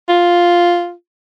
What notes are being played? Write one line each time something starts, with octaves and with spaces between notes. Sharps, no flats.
F4